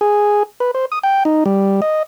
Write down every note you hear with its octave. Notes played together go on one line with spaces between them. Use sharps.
G#4
B4
C5
D#6
G5
D#4
G3
D#5